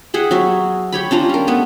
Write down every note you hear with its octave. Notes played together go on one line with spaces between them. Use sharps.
G4 G#4 E5 F#5
F#3 F#4 C#5 E5
G4 C#5 B5
C#4 D4 F4 A#5
G3 A#4
A3 B3 F#5